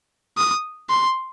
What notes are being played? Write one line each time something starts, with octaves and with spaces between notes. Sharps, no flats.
D#6
C6